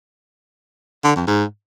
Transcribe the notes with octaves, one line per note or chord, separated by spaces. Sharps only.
D3
F2
G#2